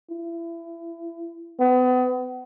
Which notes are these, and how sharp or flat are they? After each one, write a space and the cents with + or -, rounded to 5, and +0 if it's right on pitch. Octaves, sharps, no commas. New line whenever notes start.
E4 +30
B3 +35